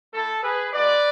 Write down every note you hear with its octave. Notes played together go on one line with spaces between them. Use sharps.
A3 E4 A4
G#4 B4
G#3 D4 F#4 B4 D5